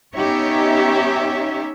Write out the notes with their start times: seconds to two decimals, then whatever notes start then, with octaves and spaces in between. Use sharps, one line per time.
0.14 B3 C#4 D#4 G4 C#5 E5